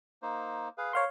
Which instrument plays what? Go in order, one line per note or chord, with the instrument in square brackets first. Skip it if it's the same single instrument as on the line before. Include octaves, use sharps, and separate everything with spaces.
[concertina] A#3 D#4 C5
G#4 B4 F5
[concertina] A#4 C5 [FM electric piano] C#5 F5 C6